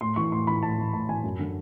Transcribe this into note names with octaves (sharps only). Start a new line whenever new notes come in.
A2 C6
E3 C#6
A2 C6
E3 B5
A2 A5
E3
A2 A5
E3 G#5
F#2
D3